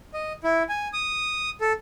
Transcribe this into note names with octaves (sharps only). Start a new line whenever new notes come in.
D#5
E4
G#5
D#6
A4